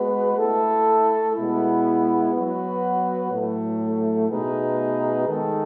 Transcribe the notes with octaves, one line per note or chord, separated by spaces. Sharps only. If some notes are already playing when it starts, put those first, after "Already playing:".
Already playing: G#3 B3 F#4 B4
A3 E4 A4
B2 G#3 B3 E4
F#3 B3 F#4 B4
A2 F#3 A3
B2 A3 D#4 G#4 B4
D#3 G#3 D#4 A4